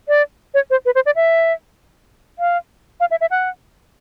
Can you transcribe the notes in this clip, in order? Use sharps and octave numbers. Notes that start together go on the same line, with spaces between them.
D5
C#5
C5
B4
C5
D5
E5
F5
F5
E5
E5
F#5